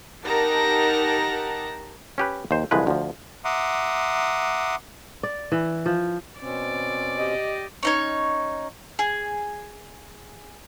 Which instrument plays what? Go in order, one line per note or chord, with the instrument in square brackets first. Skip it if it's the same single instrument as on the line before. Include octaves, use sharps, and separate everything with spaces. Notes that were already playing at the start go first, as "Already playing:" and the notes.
[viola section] D#4 G4 A#4 F#5 A5 A#5
[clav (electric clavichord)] C#4 G4 B4
D#2 C5
C2 D3 E3 F3 G#3 B4
D2 F3
[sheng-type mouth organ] E5 F#5 A#5 C6 D6 D#6
[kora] D5
E3
F3
[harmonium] B2 C4 C#4 [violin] D5
[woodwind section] G4 D#5
[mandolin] C#4 D#4 C#5
G#4